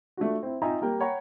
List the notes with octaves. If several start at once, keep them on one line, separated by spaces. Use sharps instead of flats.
A3 D4 F4 F#4
C4 E4
D#4 F4 E5 G5 G#5 A#5
G3 A#3 A#4 G5
C#5 F#5 G5 A#5 B5 C#6